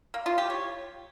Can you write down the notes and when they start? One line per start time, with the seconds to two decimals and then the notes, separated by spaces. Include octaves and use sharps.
0.14 A#3
0.26 F4
0.38 G4
0.50 C#5